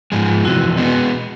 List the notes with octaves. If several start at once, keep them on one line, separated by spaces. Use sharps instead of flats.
G#2 F3 G#3
F2 C3 E3 E4 F#4
B2 G#3 B3